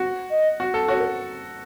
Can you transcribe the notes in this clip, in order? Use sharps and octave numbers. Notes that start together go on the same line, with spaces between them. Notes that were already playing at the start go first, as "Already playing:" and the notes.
Already playing: F#4
D#5
F#4
A4
F#4 C#5
A#4